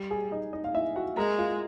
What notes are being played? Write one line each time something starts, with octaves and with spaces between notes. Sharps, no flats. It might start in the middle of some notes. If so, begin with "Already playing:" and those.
Already playing: G3
G#4 G#5
D#4 D#5
D#4 D#5
F5
E4 E5
F#4 F#5
G#3 A#4 A#5
F4 F5